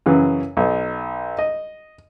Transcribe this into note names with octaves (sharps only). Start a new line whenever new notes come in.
F#2 C#3 E3
B1
D#5